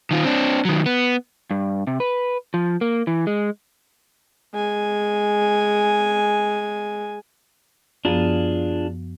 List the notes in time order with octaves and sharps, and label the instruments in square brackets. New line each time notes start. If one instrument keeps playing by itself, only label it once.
[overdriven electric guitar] D#3 F4
C4 D4
D#3 F#3
B3
[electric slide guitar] G2
C3
B4
F3
A#3
E3
G#3
[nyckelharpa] G#3 G#5
[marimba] F#2 F3 B3 [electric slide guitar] D4 F4 G#4